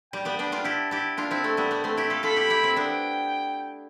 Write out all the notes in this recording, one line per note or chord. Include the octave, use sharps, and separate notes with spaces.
G3 G5
G3 B3
B3 D4
D4 F4
E4 G4 A5
E4 G4
D4 F4 A5
C4 E4
A3 C4
G3 B3
G3 B3
A3 C4
E4 G4
F4 A4
F4 A4 B5
E4 G4
E4 G4
C4 E4
B3 D4 G5